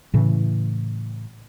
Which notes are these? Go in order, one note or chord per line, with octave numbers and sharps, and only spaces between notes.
A2 C#3 E3